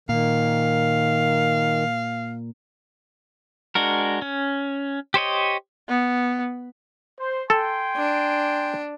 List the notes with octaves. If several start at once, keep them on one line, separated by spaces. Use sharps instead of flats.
A#2 D#3 F5
G#3 D4 F#4 A#4
C#4
G4 C5 C#5 D#5
B3
C5
A4 G5 G#5 C6
D4